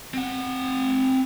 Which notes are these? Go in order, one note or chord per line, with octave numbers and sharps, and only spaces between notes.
C4 F#5